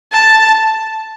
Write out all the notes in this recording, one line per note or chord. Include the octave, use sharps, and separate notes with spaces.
A5